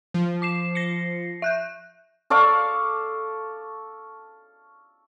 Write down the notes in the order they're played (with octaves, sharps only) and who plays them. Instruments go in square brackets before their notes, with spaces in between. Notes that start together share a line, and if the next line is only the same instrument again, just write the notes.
[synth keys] F3
[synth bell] D6 C7 E7
A#6 C7 C#7
E5 F#6 G6
[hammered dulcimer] A4 D5 F5 C#6